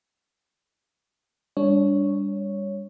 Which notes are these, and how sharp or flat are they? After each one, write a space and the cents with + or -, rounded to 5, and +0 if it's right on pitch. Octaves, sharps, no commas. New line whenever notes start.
G3 +30 D4 -25 C#5 +0